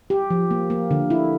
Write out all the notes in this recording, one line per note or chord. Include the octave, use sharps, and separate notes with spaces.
G4
F3
A#3
A#3
D3
E4